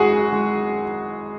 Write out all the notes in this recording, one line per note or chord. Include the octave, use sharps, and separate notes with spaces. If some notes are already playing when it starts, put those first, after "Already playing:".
Already playing: G#1 F#2 G#3 F#4 G#4
G#3